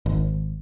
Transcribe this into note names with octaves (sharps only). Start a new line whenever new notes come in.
G#1